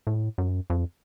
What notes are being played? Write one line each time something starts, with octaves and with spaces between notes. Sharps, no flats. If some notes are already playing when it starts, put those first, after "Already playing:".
A2
F#2
F2